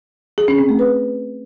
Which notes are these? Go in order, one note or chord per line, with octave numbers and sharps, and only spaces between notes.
G#4
C#4
C4
A3
B4